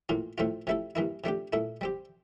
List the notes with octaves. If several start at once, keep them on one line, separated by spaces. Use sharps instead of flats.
A2 E3 A#3 F4
A2 F3 A3 C4 F4
C3 F3 A3 E4 A4
G2 E3 A#3 E4
C3 F3 A3 D4 G4
A#2 A3 E4 A4
G3 C4 G4